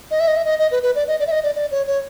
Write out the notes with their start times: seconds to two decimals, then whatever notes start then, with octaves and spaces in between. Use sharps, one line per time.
0.11 D#5
0.20 E5
0.28 D#5
0.37 E5
0.45 D#5
0.59 D#5
0.71 B4
0.83 B4
0.95 D5
1.08 D#5
1.20 D5
1.27 E5
1.31 D#5
1.44 D5
1.55 D5
1.71 C#5
1.87 C#5